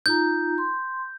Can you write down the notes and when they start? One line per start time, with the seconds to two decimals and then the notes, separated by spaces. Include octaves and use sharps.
0.06 D#4 F4 A#5 G6
0.58 C6